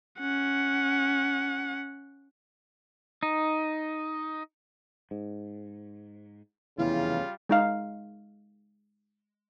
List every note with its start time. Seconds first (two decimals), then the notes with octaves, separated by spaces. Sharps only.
0.19 C#4 F#5
3.23 D#4
5.11 G#2
6.78 F1 E2 C#3 E3 G3 F4 F5
7.49 G#3 D#4 F5